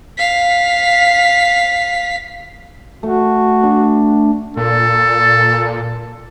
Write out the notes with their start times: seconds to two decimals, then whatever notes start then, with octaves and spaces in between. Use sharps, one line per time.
0.17 F5 B6
3.03 A3 F#4
3.63 D4
4.57 A#2 A4